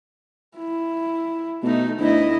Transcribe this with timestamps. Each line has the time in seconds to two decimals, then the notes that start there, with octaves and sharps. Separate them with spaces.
0.57 E4
1.63 B2 A3 D#4
1.99 D2 E4 D#5